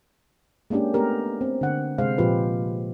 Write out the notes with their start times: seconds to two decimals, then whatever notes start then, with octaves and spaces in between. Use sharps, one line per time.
0.70 G#3 A#3 C#4 D4 G4
0.94 A3 B3 G4 A#4
1.41 C4
1.61 D3 F#5
1.98 C3 G#3 C5 F5
2.18 A#2 F3 F4 G4 B4